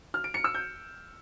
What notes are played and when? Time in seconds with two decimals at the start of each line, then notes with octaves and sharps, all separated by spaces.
0.14 F6
0.24 D7
0.34 C#7
0.44 E6
0.54 G6